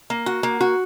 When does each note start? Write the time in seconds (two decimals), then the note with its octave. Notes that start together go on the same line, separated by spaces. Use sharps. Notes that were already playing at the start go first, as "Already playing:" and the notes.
0.10 A#3
0.26 F#4
0.43 A#3
0.61 F#4